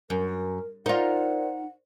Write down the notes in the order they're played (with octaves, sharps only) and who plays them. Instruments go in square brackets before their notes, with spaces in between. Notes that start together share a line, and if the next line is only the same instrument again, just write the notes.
[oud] F#2 [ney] A#4
[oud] D#4 F4 [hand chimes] A#4 C5 D5 [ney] F#5